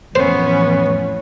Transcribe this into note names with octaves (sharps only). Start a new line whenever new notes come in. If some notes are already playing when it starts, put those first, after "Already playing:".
F2 A2 E3 B3 C#4 C5 C#5